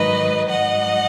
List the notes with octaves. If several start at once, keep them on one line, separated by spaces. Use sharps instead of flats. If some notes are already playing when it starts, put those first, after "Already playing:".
Already playing: G#2 D#3 F#3 B4 D#5
G#2 F#3 D#5 F#5